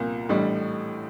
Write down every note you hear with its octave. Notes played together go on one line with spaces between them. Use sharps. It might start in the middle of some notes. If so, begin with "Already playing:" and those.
Already playing: C2 A#2 F3 A#3
A1 A2 G3 D4